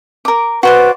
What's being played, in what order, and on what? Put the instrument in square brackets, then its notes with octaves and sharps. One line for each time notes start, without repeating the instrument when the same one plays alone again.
[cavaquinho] A#4 D6
[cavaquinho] F#4 C5 D5 [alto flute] B4